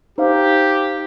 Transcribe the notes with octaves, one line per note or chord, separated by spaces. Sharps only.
D#4 G4 C5 F5